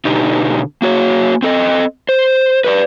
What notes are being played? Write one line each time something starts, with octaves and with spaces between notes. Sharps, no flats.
B2 D3 D#4 G4
A#3 F#4 C#5
C4 A4 D#5
C5
B4 C#5 D5